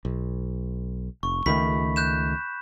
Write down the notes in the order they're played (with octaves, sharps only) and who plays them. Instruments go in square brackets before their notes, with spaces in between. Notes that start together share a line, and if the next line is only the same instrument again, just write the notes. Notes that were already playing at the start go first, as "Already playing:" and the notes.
[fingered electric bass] B1
[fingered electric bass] F1 [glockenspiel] C#6
[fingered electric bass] C#2 D#3 A3 [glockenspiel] B5 B6
[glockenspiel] F#6 G6 E7